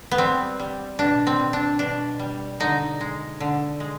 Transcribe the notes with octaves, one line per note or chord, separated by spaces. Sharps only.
B3
G3 C4
G3
B2 D4
C4
G3
D4
B2 D4
G3
D3 D#4
G#3
D3
G#3